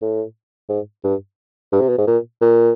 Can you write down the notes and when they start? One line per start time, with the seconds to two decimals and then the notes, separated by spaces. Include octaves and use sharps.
0.02 A2
0.69 G#2
1.04 G2
1.72 G2
1.80 C3
1.89 B2
1.98 G#2
2.07 A#2
2.41 A#2